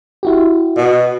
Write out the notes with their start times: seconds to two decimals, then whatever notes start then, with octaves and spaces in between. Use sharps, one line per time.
0.23 E4 F#4 G4
0.77 B2